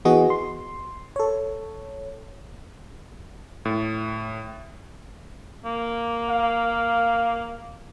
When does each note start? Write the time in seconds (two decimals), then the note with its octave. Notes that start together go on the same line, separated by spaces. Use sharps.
0.05 E3 B3 F#4 G#4 D#5
0.30 C6
1.16 A4 C#5
3.65 A2
5.65 A#3
6.29 F5